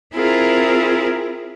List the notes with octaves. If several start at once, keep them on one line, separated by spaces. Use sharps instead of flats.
C4 E4 F4 G#4 A#4